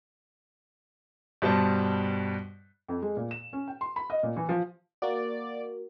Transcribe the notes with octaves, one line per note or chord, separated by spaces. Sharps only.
G2 B2 G3 C5 A5
F2
G#3
A#2
E7
C#4
G5
C6
B5
D#5
A#2
E3
F3
A#3 F#4 D5